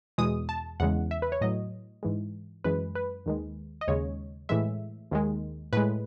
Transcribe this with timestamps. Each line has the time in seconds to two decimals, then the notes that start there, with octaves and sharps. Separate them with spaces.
0.18 E2 B2 G#3 D#6
0.49 A5
0.80 E2 C#3 G#3 F#5
1.11 E5
1.22 B4
1.32 C#5
1.41 A2 F#3 D#5
2.03 G#2 E3 G#3
2.64 F#2 E3 G#3 B4
2.95 B4
3.26 D#2 D#3 G#3
3.81 D#5
3.88 D#2 C#3 G#3 C#5
4.49 A2 E3 G#3 E5
5.11 D#2 D#3 G#3
5.73 A2 G#3 B4